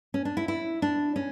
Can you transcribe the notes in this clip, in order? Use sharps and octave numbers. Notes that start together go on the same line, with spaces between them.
C#4
D4
E4
E4
D4
C#4